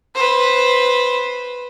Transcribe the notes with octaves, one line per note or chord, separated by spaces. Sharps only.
B4 C5